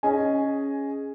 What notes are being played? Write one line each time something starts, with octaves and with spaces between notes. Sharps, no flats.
C#4 G#4 D#5 G#5